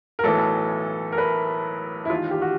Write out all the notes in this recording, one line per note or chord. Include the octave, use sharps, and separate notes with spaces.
A#4
B1 A2 E3 A4
A#4
B4
E4
E1 D#2 D#3 F4
G4
F#4